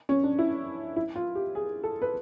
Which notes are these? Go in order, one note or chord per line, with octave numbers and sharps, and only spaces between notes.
C#4
D4
E4
E4
F4
G4
G#4
A4
B4